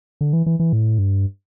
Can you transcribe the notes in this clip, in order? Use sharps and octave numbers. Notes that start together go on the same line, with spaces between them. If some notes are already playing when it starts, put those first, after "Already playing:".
D3
E3
E3
E3
A2
G2